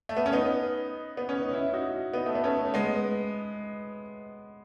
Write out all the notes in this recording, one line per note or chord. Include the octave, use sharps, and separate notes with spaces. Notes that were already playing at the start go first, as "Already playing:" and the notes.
A3
B3
C#4
B3 D#4
B3
C#4
D#4
C#4 E4
D#4 F#4
B3 D#4
A3
B3
A3 C#4
G#3 B3